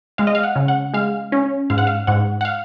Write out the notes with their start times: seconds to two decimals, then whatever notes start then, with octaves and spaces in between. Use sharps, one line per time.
0.18 G#3 F5
0.27 D#5
0.35 F5
0.43 F#5
0.56 C#3
0.68 F#5
0.93 G#3 F5
1.32 C#4
1.70 G#2 F5
1.78 F#5
1.87 F5
2.07 G#2 F#5
2.41 F#5
2.45 F5